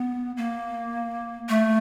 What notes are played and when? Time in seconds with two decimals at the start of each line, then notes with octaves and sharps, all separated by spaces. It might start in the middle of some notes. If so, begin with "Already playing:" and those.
Already playing: B3
0.37 A#3
1.49 A3